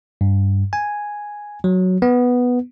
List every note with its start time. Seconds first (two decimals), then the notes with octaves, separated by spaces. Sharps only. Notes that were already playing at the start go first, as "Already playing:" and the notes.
0.21 G2
0.73 G#5
1.64 F#3
2.02 B3